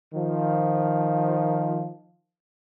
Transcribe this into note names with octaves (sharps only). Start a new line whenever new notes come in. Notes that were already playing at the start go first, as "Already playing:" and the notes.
D#3 F3